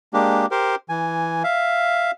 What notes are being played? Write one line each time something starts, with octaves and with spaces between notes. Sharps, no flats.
G#3 A#3 D4 G4
G4 A#4 C5
E3 G#5
E5 F5